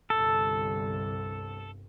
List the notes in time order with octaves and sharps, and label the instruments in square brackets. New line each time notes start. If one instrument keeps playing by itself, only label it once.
[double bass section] G1 C2 G2 [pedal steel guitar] A4